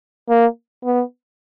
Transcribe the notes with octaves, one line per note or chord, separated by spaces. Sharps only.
A#3
B3